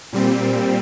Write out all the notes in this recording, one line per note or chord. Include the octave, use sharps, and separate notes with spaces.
A#2 G3 C4